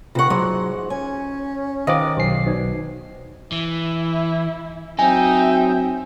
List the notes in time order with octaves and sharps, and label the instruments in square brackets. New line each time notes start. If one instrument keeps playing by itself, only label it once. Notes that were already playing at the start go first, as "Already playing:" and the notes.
[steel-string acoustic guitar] C3 F#5 [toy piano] F4 A#4 C#6
[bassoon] G#2 [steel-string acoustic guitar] F#3 [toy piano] E5 C6 D6
[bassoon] C#4 [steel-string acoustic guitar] G#5
[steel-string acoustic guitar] D#3 [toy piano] G4 C5 F5 [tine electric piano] D#5 D6
[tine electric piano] B1 C7 [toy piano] G4 C5 G#5
[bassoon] B2 [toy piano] D#4 C5 D5
[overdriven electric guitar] E3 [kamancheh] E4
[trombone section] F#3 C4 [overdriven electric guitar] D#4 [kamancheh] E5 G5 [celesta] G#5